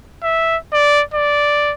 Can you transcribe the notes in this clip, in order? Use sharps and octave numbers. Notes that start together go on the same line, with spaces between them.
E5
D5
D5